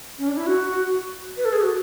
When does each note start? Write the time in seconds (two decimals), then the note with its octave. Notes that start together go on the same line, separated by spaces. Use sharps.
0.19 C#4
0.28 D4
0.37 E4
0.47 F#4
1.37 B4
1.45 A4
1.53 G#4
1.62 F#4